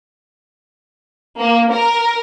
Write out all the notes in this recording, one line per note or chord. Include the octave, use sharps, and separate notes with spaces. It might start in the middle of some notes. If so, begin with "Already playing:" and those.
A#3
A#4